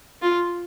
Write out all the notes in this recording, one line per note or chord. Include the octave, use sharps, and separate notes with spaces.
F4